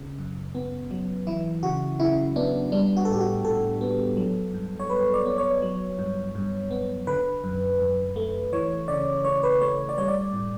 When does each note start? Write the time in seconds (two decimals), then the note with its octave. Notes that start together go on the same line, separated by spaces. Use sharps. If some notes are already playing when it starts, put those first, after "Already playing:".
Already playing: C#3
0.18 F#2
0.55 B3
0.91 F#3
1.27 E3 E4
1.63 C#3 F#4
2.00 C#3 E4
2.36 B3 D4
2.72 G3 D4
2.97 F#4
3.05 A4
3.08 A2 G4
3.21 F#4
3.44 A2 A4
3.81 B3
4.17 F#3
4.54 G2
4.80 C#5
4.90 G2 B4
5.14 D5
5.26 B3
5.38 C#5
5.62 F#3
5.99 G2
6.35 G2
6.71 B3
7.07 D3 B4
7.44 F#2
7.80 F#2
8.16 A3
8.53 E3 C#5
8.88 C#3 D5
9.24 C#3 C#5
9.43 B4
9.61 A3 C#5
9.89 D5
9.98 G3 C#5
10.08 D5
10.33 A2